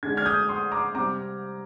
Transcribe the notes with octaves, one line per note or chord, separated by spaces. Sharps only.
D3 G#3 D4 G#6
F6 G#6
D#6 G6
C6 D#6
A#5 D6
C3 G3 C4 A#5 D6